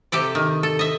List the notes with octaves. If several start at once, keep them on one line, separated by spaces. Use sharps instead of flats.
C3 G4 A4 D5
D#3
A4
D#5 E5